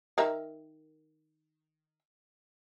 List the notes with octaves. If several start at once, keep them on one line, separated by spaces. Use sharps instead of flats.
D#3 A#4 E5